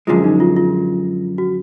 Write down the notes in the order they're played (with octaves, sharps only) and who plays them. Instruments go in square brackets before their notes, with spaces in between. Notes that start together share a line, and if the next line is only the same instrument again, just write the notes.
[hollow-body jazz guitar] F#2 D3 F3 G#3 [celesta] F4
[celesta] D#4
F4
F4
F#4